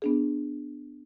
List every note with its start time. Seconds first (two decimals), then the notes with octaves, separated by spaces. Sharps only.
0.02 B3 D4 G#4